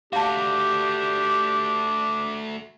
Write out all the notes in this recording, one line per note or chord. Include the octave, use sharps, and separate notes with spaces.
A3 D4 F#4 G4 F5 A5